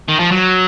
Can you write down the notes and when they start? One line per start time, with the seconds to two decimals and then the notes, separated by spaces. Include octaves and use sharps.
0.09 D#3
0.20 F3
0.32 F#3